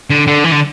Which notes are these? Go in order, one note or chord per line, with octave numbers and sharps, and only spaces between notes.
D3
D3
E3
D3